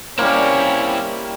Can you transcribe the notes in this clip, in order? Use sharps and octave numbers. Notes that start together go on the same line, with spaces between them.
G3 A#3 C4 C#4 E4